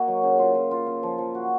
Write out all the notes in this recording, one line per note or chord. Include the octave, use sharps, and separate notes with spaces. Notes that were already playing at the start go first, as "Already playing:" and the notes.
Already playing: A#3 F#4 D#5
F#3
C#3
F4
F4
F4
F4
F3
F3
F#4